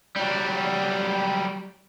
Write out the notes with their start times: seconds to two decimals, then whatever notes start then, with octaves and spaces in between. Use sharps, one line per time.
0.16 F#3 G3